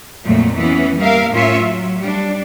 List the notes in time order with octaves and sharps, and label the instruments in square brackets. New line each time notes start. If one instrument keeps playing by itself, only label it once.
[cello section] F2 A#2 F#3 A3
E3 B3 C#4
G3 A#3 A#4 E5 F5
A2 C#4 F4 C#5 E5
F#3
G3 D4